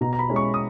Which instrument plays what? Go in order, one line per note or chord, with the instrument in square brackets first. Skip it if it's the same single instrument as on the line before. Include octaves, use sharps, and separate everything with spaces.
[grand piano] B2 A#5
A#5
B5
G#3 C#4 E4
C#6
D#6